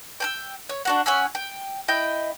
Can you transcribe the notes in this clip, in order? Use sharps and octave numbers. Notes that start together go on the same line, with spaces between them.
G5 G#5 E6
C#5
D4 F#4 F#5
C#4 F#5 G#5 E6
G5
E4 D#5 G5 G6